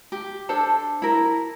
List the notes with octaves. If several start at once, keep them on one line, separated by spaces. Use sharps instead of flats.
G4
D4 A4 C5 A5
E4 A#4